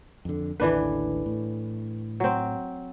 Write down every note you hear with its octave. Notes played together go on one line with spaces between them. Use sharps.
F2 D3
A1 D#2 D3 E3 D4 B4
A2
F#3 C4